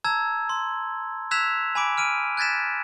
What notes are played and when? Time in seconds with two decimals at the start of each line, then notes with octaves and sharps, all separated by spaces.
0.04 A5 A#5 E6 G#6
0.49 C6
1.31 E6 F#6 G#6 B6 E7 F7
1.75 G#5 B5 D6 D7
1.98 F6 D7 D#7
2.37 F#6 G#6 A6 B6 E7